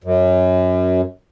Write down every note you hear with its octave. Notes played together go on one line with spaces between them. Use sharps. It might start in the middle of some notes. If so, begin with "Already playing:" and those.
F#2